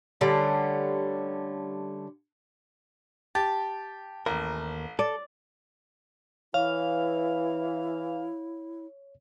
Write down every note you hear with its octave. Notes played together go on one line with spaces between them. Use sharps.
D3 G3 A3 C#4
G4 A5
A1 D#2 A#4
A4 D5
E3 E4 C#5 F5